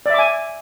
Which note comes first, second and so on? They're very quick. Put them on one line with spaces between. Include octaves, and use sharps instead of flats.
D5 E5 D6 G#5